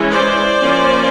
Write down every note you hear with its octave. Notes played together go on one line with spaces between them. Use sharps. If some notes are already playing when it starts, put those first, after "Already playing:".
Already playing: E3 G#3 C#4
C5 D5
F3 A#3 C#4